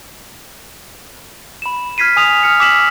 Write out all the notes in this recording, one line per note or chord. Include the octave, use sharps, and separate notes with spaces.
B5 E7
F6 G#6 B6 C7 D#7
G#5 D#6 F7
F6 C#7
D6 E6 B6 E7 F#7